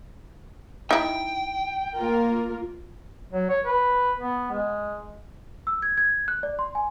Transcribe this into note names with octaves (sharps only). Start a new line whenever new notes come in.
D#4 E4 G5
A#3 F4 A#4
F#3
C#5
B4
B3
G#3
E6
G#6
G#6
F#6
D5
C6
G#5